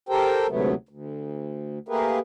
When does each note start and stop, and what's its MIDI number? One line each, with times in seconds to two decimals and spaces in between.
0.09 0.47 67
0.09 0.47 69
0.09 0.47 70
0.09 0.47 72
0.09 0.47 79
0.49 0.74 38
0.49 0.74 44
0.49 0.74 48
0.49 0.74 54
0.49 0.74 57
0.49 0.74 59
0.89 1.79 38
1.89 2.19 57
1.89 2.19 58
1.89 2.19 67
1.89 2.19 68
1.89 2.19 70
1.89 2.19 71